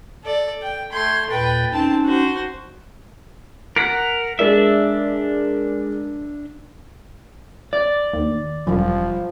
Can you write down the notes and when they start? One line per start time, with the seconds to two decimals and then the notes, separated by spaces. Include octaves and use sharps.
0.24 A4 D5
0.62 G5
0.92 A3 C6 G6 G#6
1.30 D#2 A#2 B4 G5 A6
1.72 C4 C#4 D#4 A5
2.05 F#4 C5
3.76 A#4 F#5 B6
4.39 G#3 D4 A#4 D5 E5
7.73 D5
8.13 D#2
8.67 E1 F#2 F3 G3